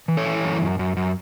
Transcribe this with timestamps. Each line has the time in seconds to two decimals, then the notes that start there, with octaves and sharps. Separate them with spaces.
0.08 E3
0.17 A4 C#5
0.26 E3
0.44 F#2
0.62 F#2
0.79 F#2
0.97 F#2